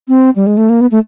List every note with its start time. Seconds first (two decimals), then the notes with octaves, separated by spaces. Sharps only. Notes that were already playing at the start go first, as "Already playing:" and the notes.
0.08 C4
0.36 G3
0.47 G#3
0.57 A3
0.69 A#3
0.81 B3
0.91 A3